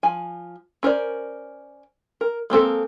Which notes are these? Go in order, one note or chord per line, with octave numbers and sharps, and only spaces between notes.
F3 G#5
C#4 A#4 C5 D5
A#4
G#3 A#3 C4 A4